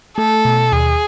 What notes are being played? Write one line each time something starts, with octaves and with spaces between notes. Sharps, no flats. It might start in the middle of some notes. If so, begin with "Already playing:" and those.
A3 A4
B2
D#2 G#4